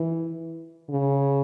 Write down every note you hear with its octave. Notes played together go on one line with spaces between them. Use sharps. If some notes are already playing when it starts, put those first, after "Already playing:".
Already playing: E3
C#3